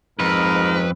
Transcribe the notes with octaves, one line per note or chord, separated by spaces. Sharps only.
F2 G#2 A#4 B4